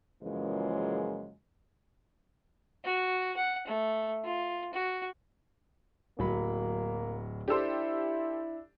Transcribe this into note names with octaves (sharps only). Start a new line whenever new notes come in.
F#2 A#2 C#3 E3 F3 G#3
F#4
F#5
A3
F4
F#4
D1 F#3 A#3 B5
D4 E4 G4 A4 C5 E6